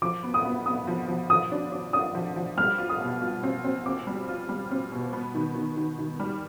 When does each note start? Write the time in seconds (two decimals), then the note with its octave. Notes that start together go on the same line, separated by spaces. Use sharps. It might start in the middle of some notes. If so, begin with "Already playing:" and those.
0.02 F3 D6
0.23 B3
0.34 D#6
0.45 B3
0.66 B3 D#6
0.87 F3
1.08 F3
1.30 F3 D#6
1.52 D4
1.72 D4
1.93 D4 D#6
2.15 F3
2.36 F3
2.57 G3 F6
2.78 F4
2.89 D#6
3.01 B2
3.22 F4
3.43 C4
3.64 C4
3.86 C4 D6
4.07 G3
4.29 F4
4.49 G3
4.71 C4
4.92 B2
5.13 B3
5.35 D#3
5.56 D#3
5.77 D#3
5.98 D#3
6.20 G3